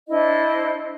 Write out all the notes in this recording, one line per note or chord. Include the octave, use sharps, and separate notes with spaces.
D4 E4 C5 D#5